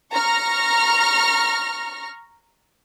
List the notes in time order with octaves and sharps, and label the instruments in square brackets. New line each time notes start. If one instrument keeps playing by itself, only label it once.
[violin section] A#5 C#6 F6 A#6